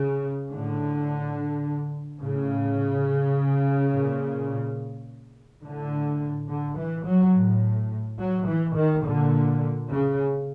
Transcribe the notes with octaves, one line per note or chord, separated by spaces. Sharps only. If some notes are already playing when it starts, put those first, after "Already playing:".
Already playing: C#3
A2 D3
A2 C#3
A#2
A2 D3
D3
E3
F#3
A2
F#3
E3
D#3
A#2 D3
C#3